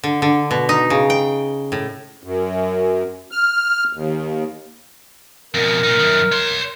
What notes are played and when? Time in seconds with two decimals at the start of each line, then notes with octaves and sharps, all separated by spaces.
0.03 D3
0.22 D3
0.51 B2
0.69 D#4
0.90 C#3
1.10 G5
1.72 A2
2.23 F#2
3.32 F6
3.93 D#2
5.54 F2 B2 A#4
5.83 A#2 D#4
5.99 F#2 D#3
6.32 C#5 C6